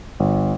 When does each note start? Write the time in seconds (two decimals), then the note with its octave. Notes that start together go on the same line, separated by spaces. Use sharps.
0.20 G1